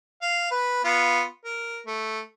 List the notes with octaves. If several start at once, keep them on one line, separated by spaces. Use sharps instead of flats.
F5
B4
B3 F4
A#4
A3